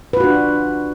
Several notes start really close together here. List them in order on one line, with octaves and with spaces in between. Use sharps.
B4 F4 F#4 D4